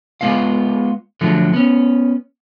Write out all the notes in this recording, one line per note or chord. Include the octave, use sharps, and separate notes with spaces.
G#3 B3 F4 F5
D3 F3 F#3 A3
B3 C#4